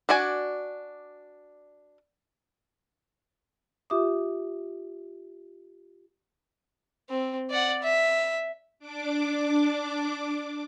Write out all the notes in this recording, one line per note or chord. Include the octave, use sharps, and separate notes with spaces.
D4 F#4 D5 G#5
F4 G4 E5 D6 D#6
C4
D5 F#5
E5
D4 D6